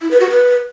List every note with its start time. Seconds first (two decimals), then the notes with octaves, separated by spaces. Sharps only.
0.01 E4
0.11 B4
0.20 F#4
0.30 B4